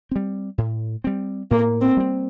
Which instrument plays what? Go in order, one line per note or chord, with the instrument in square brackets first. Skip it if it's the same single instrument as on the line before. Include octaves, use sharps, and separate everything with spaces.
[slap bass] G3 C4
A2
G3 C4
[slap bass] A2 [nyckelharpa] A#3
[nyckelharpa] C4
[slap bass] G3 C4